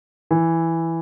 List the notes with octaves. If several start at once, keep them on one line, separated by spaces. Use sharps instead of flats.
E3